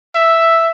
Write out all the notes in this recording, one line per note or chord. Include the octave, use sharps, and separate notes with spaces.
E5